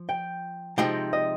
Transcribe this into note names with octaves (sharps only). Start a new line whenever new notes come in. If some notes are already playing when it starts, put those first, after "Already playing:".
Already playing: F3
G5
C3 F3 G#3 D#4 G5
D#5